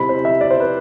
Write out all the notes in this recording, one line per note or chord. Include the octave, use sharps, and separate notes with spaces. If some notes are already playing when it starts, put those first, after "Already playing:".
Already playing: C3 G3 C4 E4 B5
C5
E5
D5
C5
B4